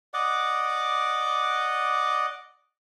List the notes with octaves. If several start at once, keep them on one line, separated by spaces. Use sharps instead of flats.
D5 D#5 F#5 D6